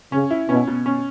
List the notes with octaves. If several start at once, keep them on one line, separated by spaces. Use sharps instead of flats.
C#3 C#4
E4
B2 C#4
B2
C#4